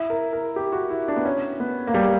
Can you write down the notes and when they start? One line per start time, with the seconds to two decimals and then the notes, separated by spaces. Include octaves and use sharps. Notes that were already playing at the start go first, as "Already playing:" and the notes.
Already playing: E4
0.10 A#4
0.33 A#4
0.56 G4
0.72 F#4
0.90 E4
1.08 D4
1.16 B3
1.25 C#4
1.60 B3
1.87 A#3
1.94 G3